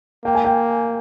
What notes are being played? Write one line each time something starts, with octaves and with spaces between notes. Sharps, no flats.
A#3 G5
G#5
G5